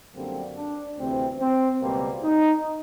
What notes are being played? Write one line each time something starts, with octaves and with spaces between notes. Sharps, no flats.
F#2 D3 G3 A#3 C4
D4
D2 C3 E3 C4
C4
C#2 B2 G3 A#3 C4
D#4